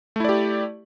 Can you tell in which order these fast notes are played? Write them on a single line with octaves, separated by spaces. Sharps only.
A3 E4 D5 G4